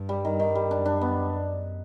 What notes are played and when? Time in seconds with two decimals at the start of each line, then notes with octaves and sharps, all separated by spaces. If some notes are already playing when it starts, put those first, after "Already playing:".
Already playing: G2
0.09 G3
0.25 D#3
0.40 D#3
0.55 G3
0.70 F#2 D4
0.86 D4
1.01 B3